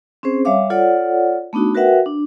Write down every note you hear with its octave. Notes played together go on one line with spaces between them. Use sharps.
C4 C#4 G#4 C5
G3 C#5 E5 F5 D6
F4 A4 C#5 D5 F#5
A3 B3 D4 D#4 F#4
F#4 A#4 B4 E5 F#5 G5
D4